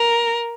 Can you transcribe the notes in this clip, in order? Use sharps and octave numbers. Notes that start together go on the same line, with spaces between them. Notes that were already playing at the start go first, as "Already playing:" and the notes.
Already playing: A#4